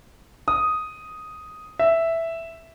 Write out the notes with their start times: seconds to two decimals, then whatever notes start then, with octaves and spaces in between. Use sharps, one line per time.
0.48 D#6
1.79 E5